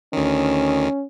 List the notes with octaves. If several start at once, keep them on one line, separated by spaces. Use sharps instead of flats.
D2 D#3 C#4